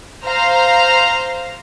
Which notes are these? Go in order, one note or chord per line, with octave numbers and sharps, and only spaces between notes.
C5 F5 A#5